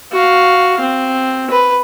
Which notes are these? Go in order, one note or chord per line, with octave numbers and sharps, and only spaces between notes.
F#4 F5
C4
B4